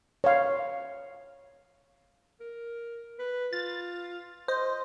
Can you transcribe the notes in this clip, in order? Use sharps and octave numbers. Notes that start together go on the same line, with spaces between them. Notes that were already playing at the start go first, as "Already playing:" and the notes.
C#5 F5
A#4
B4
F4 A6
C5 D#5